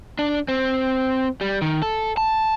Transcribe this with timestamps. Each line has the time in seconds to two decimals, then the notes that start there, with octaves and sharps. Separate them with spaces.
0.19 D4
0.48 C4
1.41 G3
1.62 D#3
1.82 A4
2.17 A5